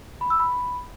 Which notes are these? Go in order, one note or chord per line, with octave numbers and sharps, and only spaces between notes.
B5
E6
B5